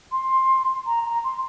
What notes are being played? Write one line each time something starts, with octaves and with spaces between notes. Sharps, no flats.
C6
A#5
A#5
C6